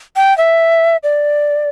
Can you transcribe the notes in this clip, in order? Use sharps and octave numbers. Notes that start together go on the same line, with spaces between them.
G5
E5
D5